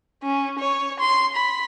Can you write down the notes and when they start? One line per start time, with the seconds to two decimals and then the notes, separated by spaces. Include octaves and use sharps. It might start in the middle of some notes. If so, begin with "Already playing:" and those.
0.23 C#4
0.59 C#5
1.00 C6
1.35 B5